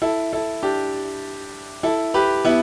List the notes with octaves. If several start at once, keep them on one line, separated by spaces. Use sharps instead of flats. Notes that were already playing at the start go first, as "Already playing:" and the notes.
E4 A4
E4 A4
D4 G4
E4 A4
G4 B4
B3 E4